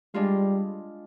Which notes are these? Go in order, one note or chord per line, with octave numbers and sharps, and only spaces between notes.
G3 G#3 D4 F4